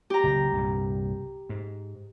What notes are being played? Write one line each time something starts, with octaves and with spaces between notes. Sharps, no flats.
G4 A#5
F#1 C#2
C2 G2 A#2
G#2